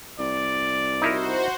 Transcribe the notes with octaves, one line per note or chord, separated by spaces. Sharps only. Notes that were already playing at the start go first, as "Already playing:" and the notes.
C2 D5
D#4 E4 F#4 A#4 C5